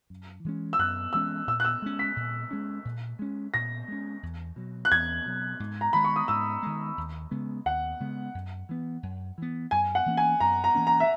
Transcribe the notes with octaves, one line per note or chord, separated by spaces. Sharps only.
F#2
E3 G#3 C#4
E6
F#2 F#6
E3 G#3 C#4 E6
A#2 E6
F#6
E6
G#3 C#4
B6
A#2
G#3 C#4
A#2
G#3 C#4
A#2 A#6
G#3 C#4
E2
B2 F#3
F#6
E2 G#6
B2 F#3
G#2
A#5
D#3 G#3 B5
C#6
D#6
G#2 E6
D#3 G#3
D#2
C#3 G#3 B3
D#2 F#5
C#3 G#3 B3
F#2
E3 B3
F#2
E3 B3
F#2 G#5
F#5
E3 A#3 C#4
G#5
F#2 A#5
A#5
E3 A#3 C#4
A#5
E5